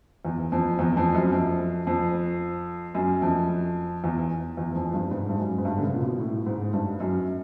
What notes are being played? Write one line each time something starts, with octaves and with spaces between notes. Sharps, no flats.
E2
F2
E2
F2
F#2
F2
F2
F#2
F2
E2
E2
F2
G2
G#2
G2
F#2
G#2
G2
D3
C#3
A#2
B2
A2
G#2
G2
F#2